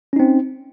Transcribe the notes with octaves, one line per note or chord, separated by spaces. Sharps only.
C4 C#4 D#4